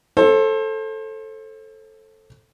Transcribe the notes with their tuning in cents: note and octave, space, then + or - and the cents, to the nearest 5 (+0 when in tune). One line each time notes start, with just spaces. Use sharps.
A4 +0 C5 +35